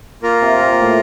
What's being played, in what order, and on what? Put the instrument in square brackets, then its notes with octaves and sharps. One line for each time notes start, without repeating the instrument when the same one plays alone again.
[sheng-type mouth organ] A#3 F4 A#4
[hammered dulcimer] C3
A#2
A2